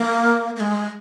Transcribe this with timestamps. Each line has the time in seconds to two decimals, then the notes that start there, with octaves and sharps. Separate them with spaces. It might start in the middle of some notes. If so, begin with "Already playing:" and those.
Already playing: A#3
0.56 A#3
0.60 G#3